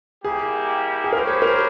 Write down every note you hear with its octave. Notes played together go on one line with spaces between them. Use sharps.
G3 A#3 E4 G4 G#4
G#4
G#3 C#4 E4 G4 A#4 C5
C#5
A#4